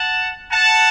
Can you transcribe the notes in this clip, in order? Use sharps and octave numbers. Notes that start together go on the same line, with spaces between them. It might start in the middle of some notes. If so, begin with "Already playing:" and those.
Already playing: F#5 A5
F#5 A5